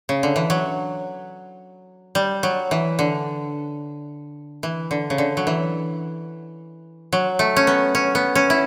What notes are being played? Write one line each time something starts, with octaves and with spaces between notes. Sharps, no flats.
C#3
D3
E3
F#3
G3
F#3
E3
D3
E3
D3
C#3
D3
F#3
E3
F#3
A3
C#4
B3
C#4
B3
C#4
E4